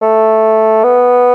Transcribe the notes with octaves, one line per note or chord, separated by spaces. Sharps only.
A3
B3